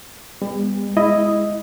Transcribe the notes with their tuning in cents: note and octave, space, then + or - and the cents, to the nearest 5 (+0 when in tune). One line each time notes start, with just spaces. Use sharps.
G3 +40 B3 +0
G#3 +0 E4 +0 D#5 +0